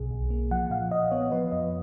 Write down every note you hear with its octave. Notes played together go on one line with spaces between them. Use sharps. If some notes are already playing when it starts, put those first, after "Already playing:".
Already playing: B1 B2 G#4
B1
A#3
F3 F#5
A#2 F5
A#2 D#5
B3 C#5
F3 B4
F2 D#5